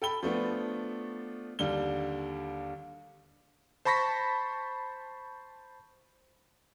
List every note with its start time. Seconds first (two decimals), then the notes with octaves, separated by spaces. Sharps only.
0.02 A4 G5 B5 G7
0.23 F3 A3 B3 D4
1.59 D#2 D3 G3 G7
3.85 C5 A5 B5 C#6 A#6 B6